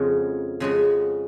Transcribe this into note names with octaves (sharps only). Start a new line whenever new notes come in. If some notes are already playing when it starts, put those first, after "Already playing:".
Already playing: F2 C#3 G#3 C#4 F#4
F2 C#3 G#3 C#4 F#4